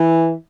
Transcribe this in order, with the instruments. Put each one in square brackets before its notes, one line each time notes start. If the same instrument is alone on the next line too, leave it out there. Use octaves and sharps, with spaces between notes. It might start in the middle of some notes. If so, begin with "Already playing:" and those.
Already playing: [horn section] E3